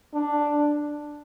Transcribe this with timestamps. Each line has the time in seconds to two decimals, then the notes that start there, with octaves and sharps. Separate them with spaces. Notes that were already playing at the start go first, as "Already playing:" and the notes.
0.14 D4